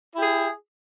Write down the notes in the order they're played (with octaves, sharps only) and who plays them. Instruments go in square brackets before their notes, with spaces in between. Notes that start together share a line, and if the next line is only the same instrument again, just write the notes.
[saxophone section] E4
G4
G#4